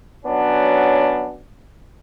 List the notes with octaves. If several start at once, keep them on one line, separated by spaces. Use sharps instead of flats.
F#3 B3 C#4 D4